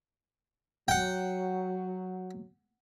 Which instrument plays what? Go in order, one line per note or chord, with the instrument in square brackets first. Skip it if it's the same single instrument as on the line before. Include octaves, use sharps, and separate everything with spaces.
[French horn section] F#3 [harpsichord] F#5 G5